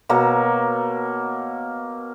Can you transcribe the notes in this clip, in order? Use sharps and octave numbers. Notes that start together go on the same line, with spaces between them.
B2 A#3 C#5 A#5